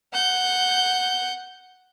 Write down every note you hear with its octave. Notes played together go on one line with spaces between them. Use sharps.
F#5 G6